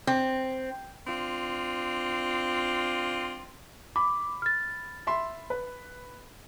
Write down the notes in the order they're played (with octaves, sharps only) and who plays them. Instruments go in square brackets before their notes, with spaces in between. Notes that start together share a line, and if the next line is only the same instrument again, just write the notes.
[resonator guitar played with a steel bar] C4
[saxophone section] C4 D4 F4
[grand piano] B5 [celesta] D6
[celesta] F6 A6
[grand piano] E5 B5 C6
B4